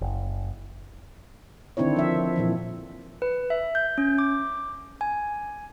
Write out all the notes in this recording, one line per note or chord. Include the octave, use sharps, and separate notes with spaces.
F#1
D3 D#3 C4 D4 E4 C#5
F3 E5
A#2 E3 F3
B4
E5
G6
C#4
D6
G#5